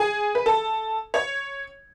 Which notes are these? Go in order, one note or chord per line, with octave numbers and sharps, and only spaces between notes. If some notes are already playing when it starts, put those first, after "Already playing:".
Already playing: G#4
B4
A4
C#5